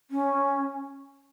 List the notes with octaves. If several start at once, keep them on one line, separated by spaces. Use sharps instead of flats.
C#4